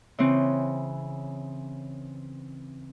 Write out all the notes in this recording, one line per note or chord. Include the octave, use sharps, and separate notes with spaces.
C#3 E3 C4